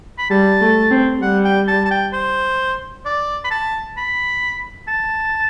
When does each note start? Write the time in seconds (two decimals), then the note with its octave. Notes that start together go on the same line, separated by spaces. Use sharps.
0.18 B5
0.30 G3 A5
0.61 A3
0.91 C4
1.22 G3 F#5
1.45 G5
1.68 A5
1.85 A5
1.91 G5
2.13 C5
3.05 D5
3.44 B5
3.51 A5
3.97 B5
4.88 A5